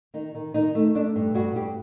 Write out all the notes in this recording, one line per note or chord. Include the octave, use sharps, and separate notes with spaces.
D#3 D#4
D#3
D#3 D#4
A3
A3 D4
G2
G2 F#4
G2 G4